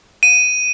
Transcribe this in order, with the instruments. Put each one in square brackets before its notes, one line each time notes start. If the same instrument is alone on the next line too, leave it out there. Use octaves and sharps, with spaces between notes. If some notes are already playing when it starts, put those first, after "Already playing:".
[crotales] D#7